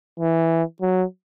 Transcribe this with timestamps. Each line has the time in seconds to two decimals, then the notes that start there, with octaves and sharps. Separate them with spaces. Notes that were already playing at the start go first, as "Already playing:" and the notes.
0.20 E3
0.82 F#3